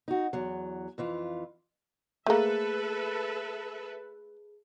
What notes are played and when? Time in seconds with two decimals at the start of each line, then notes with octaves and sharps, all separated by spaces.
0.08 D#4 F#4
0.33 E2 F#3
0.98 F2 E3 F4
2.26 A3 A#3 G#4 A4 B4 E5